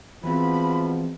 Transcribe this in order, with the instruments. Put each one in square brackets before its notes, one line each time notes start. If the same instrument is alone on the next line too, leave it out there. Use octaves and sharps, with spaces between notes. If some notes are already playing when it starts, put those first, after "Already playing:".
[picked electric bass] E3 C4 [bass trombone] F3 [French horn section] G#3 B3 F#4 [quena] B5